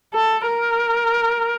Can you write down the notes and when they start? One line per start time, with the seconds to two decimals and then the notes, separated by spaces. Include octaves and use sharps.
0.14 A4
0.46 A#4